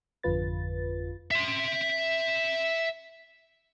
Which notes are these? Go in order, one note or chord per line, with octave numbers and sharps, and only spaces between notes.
G#1 F2 D3 F4 B4 A6
E5 C6